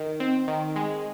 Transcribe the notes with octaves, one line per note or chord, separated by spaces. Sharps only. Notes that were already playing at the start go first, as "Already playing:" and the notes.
Already playing: D#3
C4
D#3
G#3